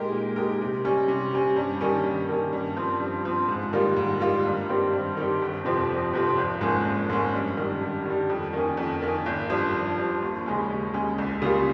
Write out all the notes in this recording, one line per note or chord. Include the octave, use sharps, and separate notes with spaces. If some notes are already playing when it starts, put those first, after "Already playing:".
Already playing: A#2 G#3 D#4 G4 A#4
A#2
G#3 D#4 G4 A#4
C3
G3 C#4
C3
G3 C#4
G2
D#3 G3 A#3 C#4
G2
D#3 G3 A#3 C#4
G2
F3 C4
G2
F3 C4
G#2
D#3 G3 A#3 F4
G#2
D#3 G3 A#3 F4
G2
D#3 G3 C4 G4
G2
D#3 G3 C4 G4
G1
F2 C3 F3 C4
G1
F2 C3 F3 C4
G#1
G#2 F3 A#3 C#4
G#1
G#2 F3 A#3 C#4
G2
D#3 G3
G2
D#3 G3
F2
D#3 A#3 C#4
F2
D#3 A#3 C#4
G#1
G2 F3
G#1
G2 F3
D#2
C#3 G#3 C#4
D#2
C#3 G#3 C#4
C#2
C#3 G3 A#3 F4